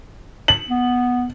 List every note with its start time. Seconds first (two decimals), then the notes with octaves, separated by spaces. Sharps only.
0.48 F#7
0.70 B3